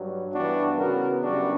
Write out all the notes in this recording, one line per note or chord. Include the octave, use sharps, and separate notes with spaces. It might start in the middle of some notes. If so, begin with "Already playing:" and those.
Already playing: G2 F#3
G2 E3 G3 B3 D4 F#4
C#3 E3 B3 F#4 A#4
F#2 C#3 G3 B3 D4 F#4